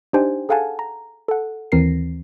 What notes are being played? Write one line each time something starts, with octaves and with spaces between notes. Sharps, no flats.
D4 D#4 G4 C5 G5 G#5
G#4 A4 F5 F#5 G#5 A5
A#5
A4 F#5
D#2 E3 C4 A#4 A#6 C7